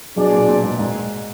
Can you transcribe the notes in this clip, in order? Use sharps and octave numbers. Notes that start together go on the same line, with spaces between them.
B2 F#3 D4 G#4 D5
A#2
A#2
G#2
G#2